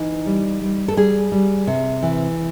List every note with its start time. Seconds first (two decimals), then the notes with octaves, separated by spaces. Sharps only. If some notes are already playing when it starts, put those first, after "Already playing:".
Already playing: E3 D#4
0.26 G3
0.61 G3
0.88 A4
0.97 G3 G#4
1.32 G3
1.67 C3
2.03 E3